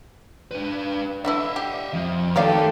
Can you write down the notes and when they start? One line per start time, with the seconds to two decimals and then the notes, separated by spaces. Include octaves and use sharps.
0.51 D4 B4
1.25 D3 E3 E4 D#5 E5
1.56 G4
1.93 F2
2.36 D#3 A3 G4 A4 C#5 D5 F5